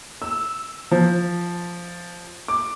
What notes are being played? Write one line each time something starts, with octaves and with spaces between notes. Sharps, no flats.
E6
F3
D6